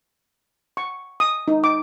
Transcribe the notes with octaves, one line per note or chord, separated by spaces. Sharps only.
C#6
D#6
D#4
D6